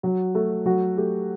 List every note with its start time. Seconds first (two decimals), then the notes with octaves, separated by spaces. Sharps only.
0.03 F#3 F#4
0.35 A3 F#4
0.66 F#3 F#4
0.97 A3 G4